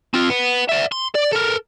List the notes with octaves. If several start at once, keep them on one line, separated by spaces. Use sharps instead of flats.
C4 F4
B3
D5 E5
C6
D5
A4 A#4